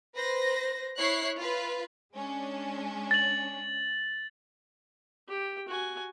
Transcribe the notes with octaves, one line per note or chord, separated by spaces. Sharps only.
B4 C5 A#6
E4 C#5 F#6 C7
F4 B4
G#3 C#4 D4
A6 F#7
G4 G5
F#4 G#5